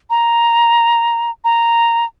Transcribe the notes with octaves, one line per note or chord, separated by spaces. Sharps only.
A#5
A#5